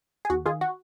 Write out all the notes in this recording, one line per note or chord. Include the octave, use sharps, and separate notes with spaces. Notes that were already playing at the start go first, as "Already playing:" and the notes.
G#4
D#2 F#4
D#3 F4 G#4
F#4